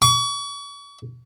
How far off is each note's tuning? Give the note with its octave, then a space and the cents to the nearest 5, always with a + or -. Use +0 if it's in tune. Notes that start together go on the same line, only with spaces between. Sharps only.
C#6 +40